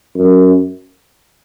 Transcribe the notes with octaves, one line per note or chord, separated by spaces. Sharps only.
F#2